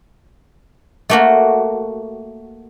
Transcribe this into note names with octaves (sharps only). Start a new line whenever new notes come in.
A3 A#3 F#4